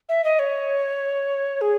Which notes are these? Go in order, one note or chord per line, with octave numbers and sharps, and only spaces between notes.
E5
D#5
C#5
G#4